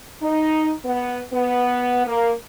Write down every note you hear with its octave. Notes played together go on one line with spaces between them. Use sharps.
D#4
B3
B3
A#3